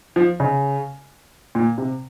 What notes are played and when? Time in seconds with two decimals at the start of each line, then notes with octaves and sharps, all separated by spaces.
0.16 F3
0.40 C#3
1.55 A#2
1.78 C3